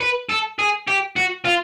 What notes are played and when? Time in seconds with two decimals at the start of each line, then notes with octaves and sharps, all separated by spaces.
0.01 B4
0.29 A4
0.59 G#4
0.87 G4
1.16 F#4
1.45 F4